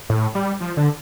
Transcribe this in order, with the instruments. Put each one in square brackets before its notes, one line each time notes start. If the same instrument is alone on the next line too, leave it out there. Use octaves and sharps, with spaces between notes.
[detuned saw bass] A2
G3
F3
D3